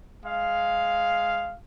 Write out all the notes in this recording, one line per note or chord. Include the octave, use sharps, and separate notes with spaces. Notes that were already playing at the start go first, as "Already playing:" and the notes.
G#3 F5